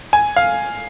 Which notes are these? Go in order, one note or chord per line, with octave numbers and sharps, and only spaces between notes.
G#5
F5